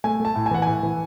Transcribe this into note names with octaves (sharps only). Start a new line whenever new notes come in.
A3 G#5
A3 A5
A2
G#5
E3 F#5
G#5
A2
E3